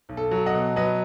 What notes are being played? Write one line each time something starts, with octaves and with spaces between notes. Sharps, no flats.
B1
A4
F#3
D#5 F#5
B2
F#3 B4 D#5